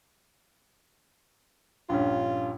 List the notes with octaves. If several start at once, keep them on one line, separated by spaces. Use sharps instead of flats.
A#1 G2 C#4 F4